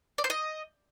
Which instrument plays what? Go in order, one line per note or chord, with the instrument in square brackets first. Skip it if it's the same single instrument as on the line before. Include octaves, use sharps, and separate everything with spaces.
[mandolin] D5
C5
D#5